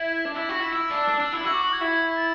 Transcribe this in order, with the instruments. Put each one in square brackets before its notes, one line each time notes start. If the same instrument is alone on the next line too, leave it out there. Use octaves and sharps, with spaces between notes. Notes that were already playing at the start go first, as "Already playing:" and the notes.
Already playing: [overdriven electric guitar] E4
D4
E4
F#4
E4
[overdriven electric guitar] E4 [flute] E6
[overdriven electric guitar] D4
D4
D4
E4
[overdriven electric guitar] F#4 [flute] E6
[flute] D6
C#6
G#6
[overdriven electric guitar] E4
[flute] A6